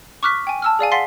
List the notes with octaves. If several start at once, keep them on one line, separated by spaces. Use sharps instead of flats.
C#6 D6 F6 F#6 B6
G5 G#5
A5 E6 F6
G#4 D5 F5 G#5
F5 F#5 C6 A6 B6 C7